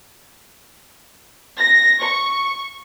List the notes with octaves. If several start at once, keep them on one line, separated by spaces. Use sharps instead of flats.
A#6
C#6